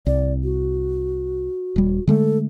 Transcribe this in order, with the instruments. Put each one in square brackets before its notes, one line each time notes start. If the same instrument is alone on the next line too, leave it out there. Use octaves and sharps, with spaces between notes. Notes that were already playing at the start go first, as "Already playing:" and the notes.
[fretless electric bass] C2 [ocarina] D5
[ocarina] F#4
[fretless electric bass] D#1 G3
[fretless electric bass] D3 G#3 A3 [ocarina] A4